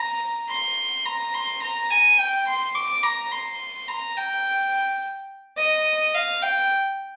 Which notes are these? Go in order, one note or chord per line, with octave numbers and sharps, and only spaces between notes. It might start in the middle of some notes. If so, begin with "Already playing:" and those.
Already playing: A#5
C6
A#5
C6
A#5
G#5
G5
C6
D6
A#5
C6
A#5
G5
D#5
F5
G5